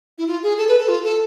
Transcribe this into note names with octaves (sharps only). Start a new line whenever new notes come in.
E4
F4
G#4
A4
B4
A4
F4
A4